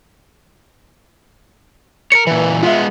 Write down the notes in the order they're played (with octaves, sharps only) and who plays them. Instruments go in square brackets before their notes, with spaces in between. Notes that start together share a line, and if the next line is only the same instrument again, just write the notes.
[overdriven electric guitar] A#4 C#5 [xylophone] C#7
[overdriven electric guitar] A#2 E3 [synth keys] B4
[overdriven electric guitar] G#3 B3 [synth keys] F4 E5